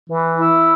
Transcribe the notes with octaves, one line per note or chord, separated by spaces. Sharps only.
E3
E4